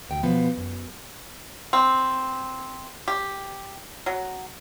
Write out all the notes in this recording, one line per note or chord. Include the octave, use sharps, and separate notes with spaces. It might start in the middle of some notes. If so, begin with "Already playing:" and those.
D2 G5
B2 F3 B3
F#2
C4
G4
F#3